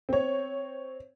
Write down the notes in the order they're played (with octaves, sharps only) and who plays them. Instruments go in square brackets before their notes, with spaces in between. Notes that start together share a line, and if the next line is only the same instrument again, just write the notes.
[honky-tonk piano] C4 C#5